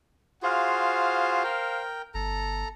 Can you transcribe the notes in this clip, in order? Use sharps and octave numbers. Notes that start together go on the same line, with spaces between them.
F4 F#4 G#4 C5 F5
A#4 G5
G1 A4 A#5